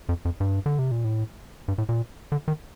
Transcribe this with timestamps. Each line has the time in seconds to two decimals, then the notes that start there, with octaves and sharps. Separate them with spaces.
0.09 F2
0.25 F2
0.40 G2
0.66 D3
0.79 C3
0.91 A#2
1.05 A2
1.68 G2
1.78 A2
1.89 A#2
2.32 D3
2.48 D#3